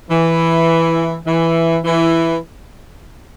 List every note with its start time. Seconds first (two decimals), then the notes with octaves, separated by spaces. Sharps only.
0.10 E3
1.26 E3
1.85 E3